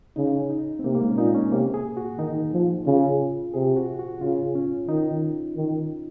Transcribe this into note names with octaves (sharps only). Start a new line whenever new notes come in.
C#3 D#4
D#4
C4
C3 A#3
A#3
G#3
C#4
A#2 D#4
C#4
C3 A#3
G#4
F#4
D#3 D#4
F3
C#3 F4
C3 G#4
F#4
F#4
C#3 F4
C#4
D#3 D#4
D#3